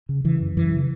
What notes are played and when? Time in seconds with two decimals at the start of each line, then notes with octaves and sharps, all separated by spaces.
0.09 C#3
0.24 C#3 E3
0.41 F#2
0.57 F#2 E3
0.72 C#3